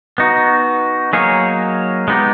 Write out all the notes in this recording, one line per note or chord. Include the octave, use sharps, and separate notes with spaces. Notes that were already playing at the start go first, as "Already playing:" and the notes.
B3 D#4 F#4
F#3 A#3 D#4 G#4 C#5
G#3 B3 D#4 G4